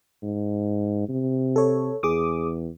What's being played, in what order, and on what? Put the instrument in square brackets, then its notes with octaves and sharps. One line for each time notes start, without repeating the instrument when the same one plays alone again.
[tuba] G#2
C3
[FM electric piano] A4 C#5
[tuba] E2 [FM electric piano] G#4 D6 D#6